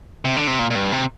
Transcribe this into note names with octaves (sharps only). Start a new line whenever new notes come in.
C3
D3
C3
A#2
A#2
G2
C3